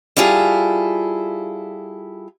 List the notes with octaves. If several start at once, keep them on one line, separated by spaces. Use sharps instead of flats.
G3 E4 F4 G#4 A4